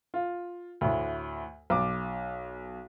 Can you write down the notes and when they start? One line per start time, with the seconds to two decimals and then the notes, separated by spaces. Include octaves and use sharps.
0.14 F4
0.81 D2 A2
1.70 B1 D6